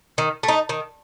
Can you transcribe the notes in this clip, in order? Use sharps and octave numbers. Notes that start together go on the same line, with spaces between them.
D#3
A3
D#4
D#3